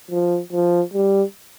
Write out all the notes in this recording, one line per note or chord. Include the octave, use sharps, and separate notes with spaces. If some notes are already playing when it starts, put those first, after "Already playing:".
F3
F3
G3